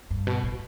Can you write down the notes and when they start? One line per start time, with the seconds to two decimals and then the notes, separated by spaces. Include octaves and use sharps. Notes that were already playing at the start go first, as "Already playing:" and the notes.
0.11 G2
0.27 B2
0.44 A2